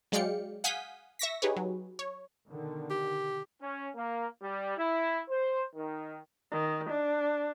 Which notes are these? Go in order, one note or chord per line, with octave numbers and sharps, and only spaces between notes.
F#3 G#3 D5 F5 G5 C#7
F5 F#5 G#5 D#6 G6 B6
E5 C#6 A#6 B6
D#4 G4 G#4 B4 C#5
F#3
C#5
B2 D3 D#3
G4
C#4
A#3
G3
E4
C5
D#3
D#3
D4